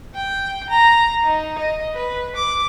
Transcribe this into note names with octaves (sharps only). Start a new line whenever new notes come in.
G5
A#5
D#4
D#5
B4
D6